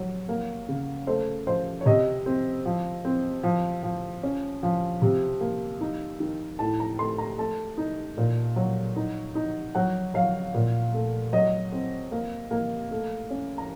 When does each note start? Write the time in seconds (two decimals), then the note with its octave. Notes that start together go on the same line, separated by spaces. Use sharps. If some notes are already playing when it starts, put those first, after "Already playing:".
Already playing: F#3
0.29 A#3
0.68 C#3
1.07 A3 C5
1.47 F3 C5
1.81 C#5
1.86 C3 D#5
2.26 C4
2.65 F3
3.05 C4
3.43 F3
3.83 F3
4.23 C#4
4.63 F3
5.02 C3
5.41 A#3
5.81 D#4
6.20 D#3
6.59 A2 A5
6.80 A#5
6.99 A3 C6
7.18 A#5
7.39 A3 A5
7.78 D#4
8.17 A#2
8.56 F#3
8.96 D#4
9.35 D#4
9.75 F#3 F#5
10.14 F#3 F5
10.54 A#2
10.94 A3
11.33 F#3 D#5
11.72 C4
12.12 A#3
12.51 A#3
12.91 A3
13.30 C#4
13.58 A#5